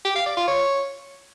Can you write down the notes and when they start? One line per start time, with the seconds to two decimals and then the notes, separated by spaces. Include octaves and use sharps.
0.05 G4
0.15 F5
0.26 D5
0.37 F4
0.48 C#5